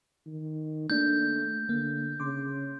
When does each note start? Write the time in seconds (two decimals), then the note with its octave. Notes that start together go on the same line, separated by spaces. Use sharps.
0.26 D#3
0.90 A3 A#3 D4 G6
1.69 D3 A#3
2.20 C#3 C6 D6